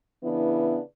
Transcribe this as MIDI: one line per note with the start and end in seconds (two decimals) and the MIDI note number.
0.24 0.79 49
0.24 0.79 52
0.24 0.79 59
0.24 0.79 62
0.24 0.79 64